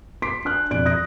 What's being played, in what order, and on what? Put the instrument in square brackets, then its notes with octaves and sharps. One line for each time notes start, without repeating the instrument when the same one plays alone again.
[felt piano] C6 D6 B6 C7 D7
D4 G#5 F6 F#6
E1 F2 D5 F#6 D7
D#6 F#6 A#6 D7